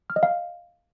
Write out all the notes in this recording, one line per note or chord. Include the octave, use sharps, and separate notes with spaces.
F6
D#5
F5